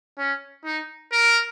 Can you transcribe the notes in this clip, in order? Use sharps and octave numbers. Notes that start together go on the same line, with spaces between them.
C#4
D#4
A#4